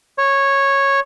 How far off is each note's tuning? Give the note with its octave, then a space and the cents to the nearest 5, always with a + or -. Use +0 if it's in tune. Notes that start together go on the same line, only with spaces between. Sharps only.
C#5 -10